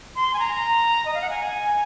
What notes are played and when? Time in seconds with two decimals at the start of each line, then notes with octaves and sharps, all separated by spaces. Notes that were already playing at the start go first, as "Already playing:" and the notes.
0.16 C6
0.34 G#5
0.39 A#5
1.05 D#5
1.14 F5
1.21 F#5
1.30 G#5